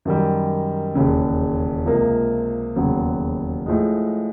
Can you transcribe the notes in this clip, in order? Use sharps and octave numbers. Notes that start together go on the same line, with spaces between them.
F#2 D#3 G3
E1 D#2 C#3
C#2 C3 F3 A#3
E1 D#2 C#3 F#3 B3
A2 F3 G#3